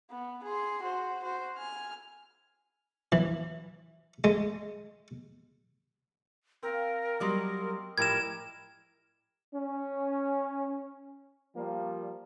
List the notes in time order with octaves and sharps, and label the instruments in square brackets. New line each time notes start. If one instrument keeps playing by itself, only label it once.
[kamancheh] B3
G#4 C6
F#4 C5
F#4 C5
G#5 F6
[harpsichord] E3
G#3
[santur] C4 F5 [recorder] A#4
[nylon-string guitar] F#3 G3 A#3 [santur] D5 D#5 C6
[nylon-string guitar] A2 F3 [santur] G3 E4 [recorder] A#4 [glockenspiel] G#6 E7
[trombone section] C#4
F3 G3 A#3